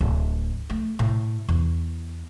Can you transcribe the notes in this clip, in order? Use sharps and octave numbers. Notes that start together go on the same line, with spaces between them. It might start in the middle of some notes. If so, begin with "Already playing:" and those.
D1
A3
A2
E2